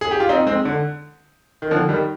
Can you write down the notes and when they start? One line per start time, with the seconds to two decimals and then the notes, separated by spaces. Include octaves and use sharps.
0.01 G#4
0.11 G4
0.20 F4
0.29 C4 D#4
0.47 G#3 C4
0.65 D3
1.62 D#3
1.71 D3 F3
1.89 D#3 G3